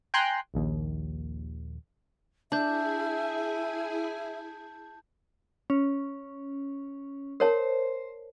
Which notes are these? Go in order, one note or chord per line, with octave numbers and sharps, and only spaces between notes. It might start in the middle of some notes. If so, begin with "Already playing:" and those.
G5 G#5 A#5 C6 F#6
A#1 D#2
D4 E4 G#4 E5 G#5 A5 G6
C#4
A#4 C5 C#5 A5